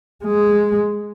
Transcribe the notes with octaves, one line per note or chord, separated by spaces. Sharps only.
G#3